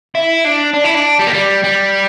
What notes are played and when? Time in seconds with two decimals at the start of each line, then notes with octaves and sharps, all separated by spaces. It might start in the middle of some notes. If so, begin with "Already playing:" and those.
0.15 E4
0.45 D4
0.74 D4
0.84 E4
0.95 D4
1.19 G3
1.27 A#3
1.34 G3
1.64 G3